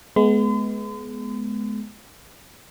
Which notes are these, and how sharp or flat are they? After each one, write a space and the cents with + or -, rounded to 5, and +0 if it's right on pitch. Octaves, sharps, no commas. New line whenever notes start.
G#3 +30 B3 +0 C6 -45